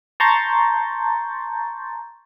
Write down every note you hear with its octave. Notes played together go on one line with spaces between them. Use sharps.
A5 A#5 C6 C#6 G6 A6